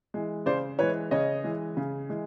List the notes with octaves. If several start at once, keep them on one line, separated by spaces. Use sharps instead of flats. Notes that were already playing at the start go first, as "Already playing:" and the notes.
E3 G#3
C#3 C5 D5
E3 G#3 B4 C#5
C#3 C#5 D#5
E3 G#3
C#3
E3 G#3